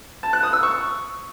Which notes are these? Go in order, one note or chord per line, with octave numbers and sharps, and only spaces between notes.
A5
F#6
D#6
E6
C#6